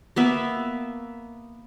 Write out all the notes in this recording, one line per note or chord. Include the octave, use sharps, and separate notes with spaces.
A#3 B3 E5